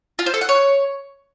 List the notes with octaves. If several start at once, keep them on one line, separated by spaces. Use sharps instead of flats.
F4
C5
A4
F#5
C#5